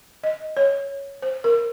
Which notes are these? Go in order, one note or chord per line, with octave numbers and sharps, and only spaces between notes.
D#5
C#5
C5
A#4